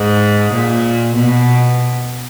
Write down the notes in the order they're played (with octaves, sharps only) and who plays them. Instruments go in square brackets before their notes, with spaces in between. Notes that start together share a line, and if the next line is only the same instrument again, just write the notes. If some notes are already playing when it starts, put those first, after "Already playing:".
Already playing: [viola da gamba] G#2
A#2
B2